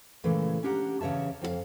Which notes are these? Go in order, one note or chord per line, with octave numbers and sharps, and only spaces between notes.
A#2 C#3 E3 G#3 A3
C#4 D4 G4 F#5 A#5
E2 C#3 C#5 E5 A5
F2 F#4 F5